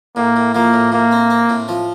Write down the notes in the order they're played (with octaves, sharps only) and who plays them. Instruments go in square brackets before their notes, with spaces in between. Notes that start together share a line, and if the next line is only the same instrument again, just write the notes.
[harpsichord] A2 [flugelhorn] A#3
[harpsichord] A2
[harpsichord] F3 [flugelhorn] A#3
[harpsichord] A2
[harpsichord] A2 [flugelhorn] A#3
[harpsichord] C4
C4
A2
F3